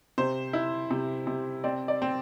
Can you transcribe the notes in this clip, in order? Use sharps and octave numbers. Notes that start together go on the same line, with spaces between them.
C3 C5
E4
C3
C3
C4 D5
D5
C4